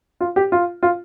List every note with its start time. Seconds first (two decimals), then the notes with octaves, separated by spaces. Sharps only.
0.20 F4
0.36 G4
0.52 F4
0.83 F4